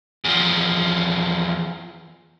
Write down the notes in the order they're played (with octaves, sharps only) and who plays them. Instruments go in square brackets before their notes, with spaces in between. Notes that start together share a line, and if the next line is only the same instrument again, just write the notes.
[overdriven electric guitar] E2 F3